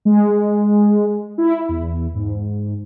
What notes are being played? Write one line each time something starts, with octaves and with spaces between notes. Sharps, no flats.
G#3
E4
E2
G#2